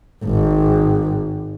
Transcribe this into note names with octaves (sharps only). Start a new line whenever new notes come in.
G#1